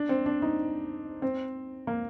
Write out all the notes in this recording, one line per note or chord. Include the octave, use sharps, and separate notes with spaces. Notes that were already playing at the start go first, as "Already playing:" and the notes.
Already playing: D4
C4
D4
D#4
C4
A#3